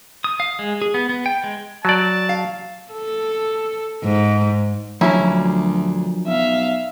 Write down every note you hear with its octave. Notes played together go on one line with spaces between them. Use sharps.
D#6
F5
G#3
G#4
B3
B3
G5
G#3
F#3 D5 A5
F5
A4
G#2
D2 F3 F#3 A#3 C#4 E4
B1 E5 F5